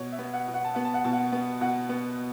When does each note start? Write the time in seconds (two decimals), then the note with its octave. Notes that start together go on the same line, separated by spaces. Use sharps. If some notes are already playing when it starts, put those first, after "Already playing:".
Already playing: B2 C#5
0.12 E5
0.19 B3
0.33 F#5
0.48 B2
0.54 F#5
0.65 A5
0.75 B3 F#5
0.85 A5
0.94 F#5
1.04 B2 A5
1.13 F#5
1.32 B3
1.61 B2 F#5
1.89 B3